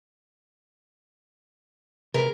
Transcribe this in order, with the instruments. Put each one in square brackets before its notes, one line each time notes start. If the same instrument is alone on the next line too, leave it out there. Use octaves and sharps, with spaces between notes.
[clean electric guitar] C3 G#4 B4 [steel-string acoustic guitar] A#4